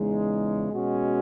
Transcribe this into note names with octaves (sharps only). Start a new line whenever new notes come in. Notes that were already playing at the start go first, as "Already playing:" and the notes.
Already playing: E2 C#3 G#3 D#4
B2 G#3 C#4 F#4